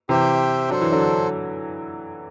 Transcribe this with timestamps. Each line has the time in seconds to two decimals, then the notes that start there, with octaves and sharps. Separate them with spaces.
0.09 C3 E3 G4 C5 E5 G5
0.69 F#3 D4 A4 C5
0.81 E3
0.92 D3 F#3